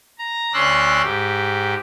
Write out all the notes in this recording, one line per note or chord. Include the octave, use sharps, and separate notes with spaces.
A#5
D2 C#4 D5 C6 E6 F#6
G#2 G4